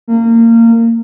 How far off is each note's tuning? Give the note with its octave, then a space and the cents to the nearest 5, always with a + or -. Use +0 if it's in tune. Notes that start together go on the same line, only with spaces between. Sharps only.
A#3 -25